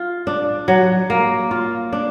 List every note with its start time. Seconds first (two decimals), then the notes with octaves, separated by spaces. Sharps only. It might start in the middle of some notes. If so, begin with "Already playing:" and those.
Already playing: F4
0.27 D4
0.68 F#3
1.10 A#3
1.51 F4
1.93 D4